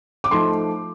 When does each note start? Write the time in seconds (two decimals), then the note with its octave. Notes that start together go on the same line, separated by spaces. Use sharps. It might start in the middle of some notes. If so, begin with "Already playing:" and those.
0.24 D6
0.31 F3 A3 D#4 C6